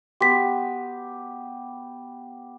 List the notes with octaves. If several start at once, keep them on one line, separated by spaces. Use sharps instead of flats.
B3 G4 C6 B6